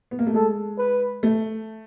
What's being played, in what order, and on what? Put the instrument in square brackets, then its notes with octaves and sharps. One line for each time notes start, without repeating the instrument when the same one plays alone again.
[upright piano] B3
A#3
A3
[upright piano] G#3 [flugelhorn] A4
[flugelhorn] B4
[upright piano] A3